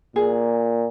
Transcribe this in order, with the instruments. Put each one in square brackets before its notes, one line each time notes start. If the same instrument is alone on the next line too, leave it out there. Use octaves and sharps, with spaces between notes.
[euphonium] A#2 [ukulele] G#4